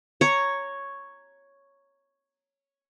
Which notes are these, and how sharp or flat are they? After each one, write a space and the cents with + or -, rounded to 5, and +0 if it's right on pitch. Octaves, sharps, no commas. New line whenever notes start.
C#5 +0 A#5 +0